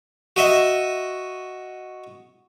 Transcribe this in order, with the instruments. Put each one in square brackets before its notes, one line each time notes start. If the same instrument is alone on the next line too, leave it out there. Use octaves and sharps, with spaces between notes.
[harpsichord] F#4 D#5 E5